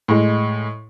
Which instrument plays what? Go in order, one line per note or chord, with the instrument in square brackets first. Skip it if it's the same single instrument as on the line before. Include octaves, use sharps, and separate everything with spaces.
[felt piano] A2 G#3